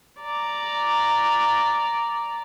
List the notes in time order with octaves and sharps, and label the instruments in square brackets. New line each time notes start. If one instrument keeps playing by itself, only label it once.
[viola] D5 A#5